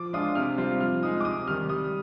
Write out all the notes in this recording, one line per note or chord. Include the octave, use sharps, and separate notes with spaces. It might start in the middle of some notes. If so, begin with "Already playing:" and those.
Already playing: F3 D6
G#3 D4 F4 D#6
C3 F6
G3 C4 F4
F3 F6
G#3 D#4 D#6
D6
C3 D#6
D#3 G3 F6
G3 D#6